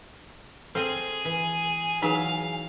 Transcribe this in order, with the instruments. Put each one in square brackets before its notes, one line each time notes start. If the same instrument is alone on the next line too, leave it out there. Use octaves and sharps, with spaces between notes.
[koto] C4 C5 [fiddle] G#4 [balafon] A4
[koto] E3 [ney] G#5
[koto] E3 F#3 E5 [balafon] D#4 G#4 [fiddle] F5